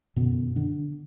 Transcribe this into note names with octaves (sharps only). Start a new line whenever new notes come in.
F#2 B2 D3 B3
D3 D4